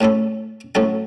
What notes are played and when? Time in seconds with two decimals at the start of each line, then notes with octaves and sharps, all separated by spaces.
0.01 A2 A3 C#4 A4
0.75 A2 F#3 C#4 A4